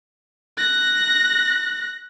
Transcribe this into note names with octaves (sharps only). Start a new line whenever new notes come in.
F#6 A#6